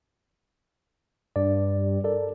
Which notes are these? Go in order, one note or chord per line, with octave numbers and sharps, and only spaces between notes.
G2 D5
A4 A#4 D5